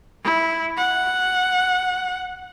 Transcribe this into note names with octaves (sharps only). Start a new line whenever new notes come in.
E4
F#5